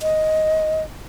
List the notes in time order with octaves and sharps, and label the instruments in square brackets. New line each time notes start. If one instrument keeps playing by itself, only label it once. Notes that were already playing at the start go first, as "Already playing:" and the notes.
[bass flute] D#5